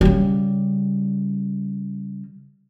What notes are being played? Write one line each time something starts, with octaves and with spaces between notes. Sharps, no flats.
C#3 G3